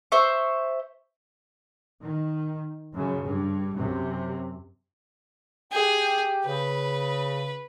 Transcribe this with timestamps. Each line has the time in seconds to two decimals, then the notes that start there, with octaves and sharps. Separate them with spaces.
0.12 C5 E5 C#6
2.02 D#3
2.93 F#2 C#3
3.23 G2
3.76 F#2 C3
5.72 G4 G#4 G5
6.46 C#3 B4